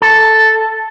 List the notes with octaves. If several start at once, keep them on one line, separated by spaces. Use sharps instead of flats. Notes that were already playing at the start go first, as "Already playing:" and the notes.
A4